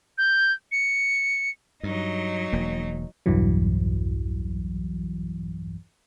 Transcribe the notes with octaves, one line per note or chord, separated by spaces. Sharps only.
G6
C#7
G2 F#3 D#4
E1 A#3
B1 E2 G2 E3 F#3